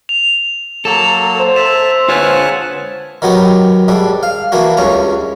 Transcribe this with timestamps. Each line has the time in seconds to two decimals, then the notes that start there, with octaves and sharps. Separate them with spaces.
0.09 F7
0.85 F#3 A#3 A4 E7 F7
1.39 C5
1.56 E5 A5 E6 E7
2.09 F4 B4 C#5 F#5 G#5 A5
3.22 D#3 F#3 B3 G4
3.88 G#2 G3 D4
4.23 F5
4.52 E3 A#3 D4 F#4
4.77 C#2 G2 C#4 A#5